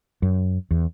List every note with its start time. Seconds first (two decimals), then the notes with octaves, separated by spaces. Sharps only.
0.22 F#2
0.71 E2